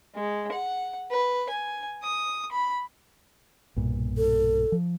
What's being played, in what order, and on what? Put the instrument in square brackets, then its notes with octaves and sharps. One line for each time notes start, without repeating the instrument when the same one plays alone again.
[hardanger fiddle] G#3
F#5
B4
G#5
D#6
B5
[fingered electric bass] B1 G2 A#2
[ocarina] A4
[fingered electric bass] F3